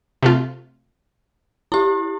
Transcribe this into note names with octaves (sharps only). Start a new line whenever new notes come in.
C3 A3 F4
E4 G4